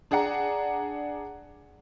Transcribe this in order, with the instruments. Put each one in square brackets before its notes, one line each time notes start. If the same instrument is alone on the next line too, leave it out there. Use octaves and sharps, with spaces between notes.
[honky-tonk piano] D4 G#4 D5 F#5 A#5